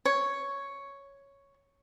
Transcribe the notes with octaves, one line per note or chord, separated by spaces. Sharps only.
C#5